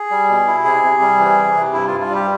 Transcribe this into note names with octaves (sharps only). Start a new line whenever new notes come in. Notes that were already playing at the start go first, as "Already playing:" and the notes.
Already playing: G#4
G3
B2
E4
C3 G#4
C3
G3
E3
C3
C3
G2 E4
G2 F4
F4
G3 G4